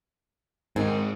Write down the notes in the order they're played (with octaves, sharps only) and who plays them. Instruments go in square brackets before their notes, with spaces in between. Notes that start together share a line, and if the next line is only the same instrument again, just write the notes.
[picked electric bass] G#2 [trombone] D#3 [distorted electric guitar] C4 D#4 [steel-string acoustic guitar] G#4